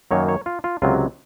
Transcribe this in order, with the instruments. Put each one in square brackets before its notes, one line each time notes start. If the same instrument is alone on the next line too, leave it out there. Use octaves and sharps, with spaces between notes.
[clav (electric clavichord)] F#2 D#3 F#3 A#3 C#5
C#5
F4
F4
C#2 C3 F#3 F4